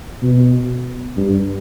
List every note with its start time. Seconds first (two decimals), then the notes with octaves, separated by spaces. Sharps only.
0.22 B2
1.17 G2